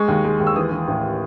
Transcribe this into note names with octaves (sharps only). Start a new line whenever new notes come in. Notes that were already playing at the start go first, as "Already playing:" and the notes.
Already playing: G#3 C#6
D#2
G#3
D#2
E6
E3 D#6
E3
A1